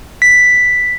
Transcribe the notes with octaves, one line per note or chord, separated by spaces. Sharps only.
B6